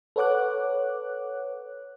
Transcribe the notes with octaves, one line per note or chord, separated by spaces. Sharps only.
A4 B4 C#5 F#5 D6 F#6